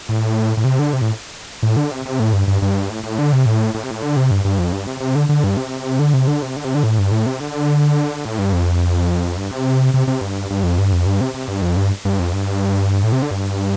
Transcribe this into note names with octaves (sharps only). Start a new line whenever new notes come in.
A2
A2
C3
D3
C3
A2
A2
D3
C3
C3
A2
G2
G2
G2
A2
A2
D3
C3
A2
A2
C3
A2
D3
C3
G2
G2
F2
G2
C3
C3
D3
D3
G2
C3
D3
C3
D3
C3
D3
C3
D3
A2
G2
A2
C3
D3
A2
G2
F2
G2
C3
C3
C3
G2
G2
F2
G2
F2
G2
C3
C3
G2
F2
G2
G2
F2
G2
A2
C3
D3
G2